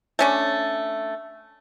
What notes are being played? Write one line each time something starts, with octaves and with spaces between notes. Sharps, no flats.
A3 C#4 D4